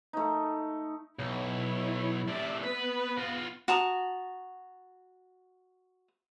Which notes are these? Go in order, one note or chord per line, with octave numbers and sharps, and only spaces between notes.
A3 D#4
B1 E4 C#5
A2 C3 D5 E5
B3 B4
F4 F#4
F#4 A5 A#5 D#6